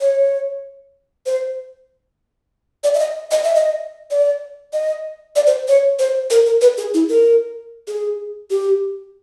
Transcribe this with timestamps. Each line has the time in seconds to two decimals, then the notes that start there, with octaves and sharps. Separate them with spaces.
0.01 C#5
1.26 C5
2.84 D5
2.94 E5
2.99 D#5
3.31 D#5
3.44 E5
3.55 D#5
4.11 D5
4.73 D#5
5.36 D5
5.47 C5
5.68 C#5
5.99 C5
6.30 A#4
6.46 A#4
6.61 B4
6.78 G#4
6.94 E4
7.09 A#4
7.88 G#4
8.50 G4